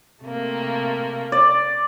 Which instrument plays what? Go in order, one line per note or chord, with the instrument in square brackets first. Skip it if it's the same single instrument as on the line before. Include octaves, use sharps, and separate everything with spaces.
[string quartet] C3 A3 A#3
[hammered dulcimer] D5